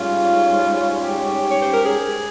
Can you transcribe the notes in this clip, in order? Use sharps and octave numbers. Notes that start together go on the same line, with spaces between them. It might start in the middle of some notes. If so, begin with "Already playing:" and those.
Already playing: G#2 G3 C#4 F4
G4
C#5
C5
A#4
G#4